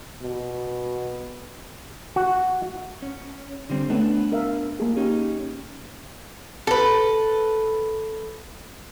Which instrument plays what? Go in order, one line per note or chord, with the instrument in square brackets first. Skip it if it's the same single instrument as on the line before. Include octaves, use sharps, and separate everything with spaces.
[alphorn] B2
[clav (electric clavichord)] F#4
[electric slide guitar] C#4
D3 G3 C4
[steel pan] A3 C#4 [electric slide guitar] B3 D4 B4
[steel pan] A#4 E5 F5
A#3 G#4
[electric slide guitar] C#4 D#4 [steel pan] G4
[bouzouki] A4 B4